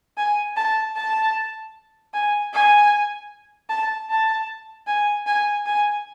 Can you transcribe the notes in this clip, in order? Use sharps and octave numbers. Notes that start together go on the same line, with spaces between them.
G#5
A5
A5
G#5
G#5
A5
A5
G#5
G#5
G#5